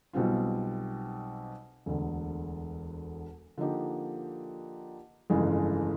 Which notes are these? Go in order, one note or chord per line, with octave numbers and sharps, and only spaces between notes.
B1 B2 G3 C4 F4
E1 D2 D3
D3 F3 A#3 D#4 G4
G1 F2 C#3 E3 G#3